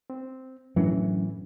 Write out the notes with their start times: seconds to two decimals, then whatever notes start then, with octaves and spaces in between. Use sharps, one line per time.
0.10 C4
0.76 F#2 A2 E3 F#3 C#4 D4